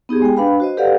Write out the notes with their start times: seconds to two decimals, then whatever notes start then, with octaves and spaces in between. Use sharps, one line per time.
0.09 B3 D#4 G4 G#4
0.22 G#3 G5
0.37 D4 B4 F5 B5
0.60 F#4 C5 D#5
0.77 G4 A4 B4 D5 F5 F#5